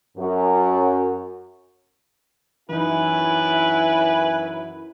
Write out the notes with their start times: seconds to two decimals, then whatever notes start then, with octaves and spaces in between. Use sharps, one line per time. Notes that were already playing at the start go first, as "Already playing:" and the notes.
0.17 F#2
2.69 F#2 E3 D#4 E4 B4 G#5